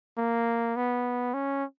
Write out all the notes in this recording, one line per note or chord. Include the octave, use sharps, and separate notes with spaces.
A#3
B3
C#4